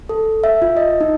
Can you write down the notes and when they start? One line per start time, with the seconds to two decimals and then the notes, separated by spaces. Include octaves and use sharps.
0.09 A4
0.44 E5
0.62 F4
0.77 D#5
1.01 D#4